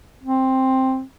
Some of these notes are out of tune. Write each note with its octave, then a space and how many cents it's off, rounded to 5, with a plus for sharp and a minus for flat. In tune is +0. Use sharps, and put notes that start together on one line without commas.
C4 +5